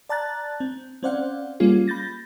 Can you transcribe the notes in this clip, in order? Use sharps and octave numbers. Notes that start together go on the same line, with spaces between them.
D5 A5 A#5 F#6 A6
C4
C4 C#4 C5 D5 F5 F#5
G3 A#3 C#4 F4 G#4
B5 G6 A6 A#6